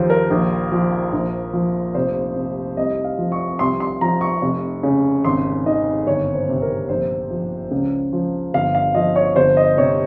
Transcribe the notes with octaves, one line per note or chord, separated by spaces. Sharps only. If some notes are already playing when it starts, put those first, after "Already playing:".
Already playing: D#2 F3 C5
A#4
A#1
F3
A#1
F3
F1 C5
C3
C2 D#5
F5
F3
C#6
C2 C6
C6
F3 A#5
C#6
F1
C#3
G#1 C6
D#3 D#5
G1 C#5
C5
C3
A#4
A#1 C5
F3
C#2
F3
G1 F5
F5
F3 D#5
C#5
G1 C5
D#5
C3 C#5